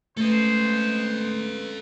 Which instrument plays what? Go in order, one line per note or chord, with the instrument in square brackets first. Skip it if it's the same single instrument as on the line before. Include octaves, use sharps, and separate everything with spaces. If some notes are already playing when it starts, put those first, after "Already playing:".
[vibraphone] G#3 C#4 B4 [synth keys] A3 [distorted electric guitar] A4 D#5 [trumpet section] C5